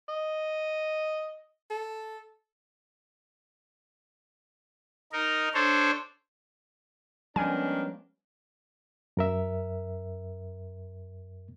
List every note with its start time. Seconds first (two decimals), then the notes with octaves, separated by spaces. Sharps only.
0.09 D#5
1.70 A4
5.13 D#4 A#4
5.54 D4 A4 C5 C#5
7.36 D#3 F3 G3 G#3 B3 C#4 D4 G#5
9.17 F#2 A#4 E5